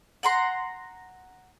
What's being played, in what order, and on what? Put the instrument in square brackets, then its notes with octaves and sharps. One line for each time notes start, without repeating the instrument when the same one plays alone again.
[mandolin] F#5 A#5 C6